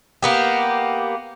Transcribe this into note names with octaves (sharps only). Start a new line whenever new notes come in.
A#3 B3 G4